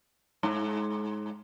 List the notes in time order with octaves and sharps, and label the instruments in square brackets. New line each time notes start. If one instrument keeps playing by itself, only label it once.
[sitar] G#2